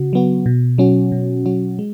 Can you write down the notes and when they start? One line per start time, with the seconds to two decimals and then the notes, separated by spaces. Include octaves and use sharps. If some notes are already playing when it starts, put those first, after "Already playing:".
Already playing: C#3 F#4
0.13 F#3 B3 F#4
0.46 B2
0.78 F#3 C#4 F#4
1.12 B2
1.46 F#3 C#4 F#4
1.79 G#3